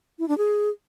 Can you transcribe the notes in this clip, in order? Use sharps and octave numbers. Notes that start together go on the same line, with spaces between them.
E4
D4
G#4